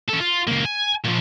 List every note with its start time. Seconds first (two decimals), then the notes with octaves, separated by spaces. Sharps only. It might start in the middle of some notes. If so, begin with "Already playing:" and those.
0.09 C#4 A4
0.21 F4
0.48 C#2 A#3
0.65 G#5
1.05 A#2 F3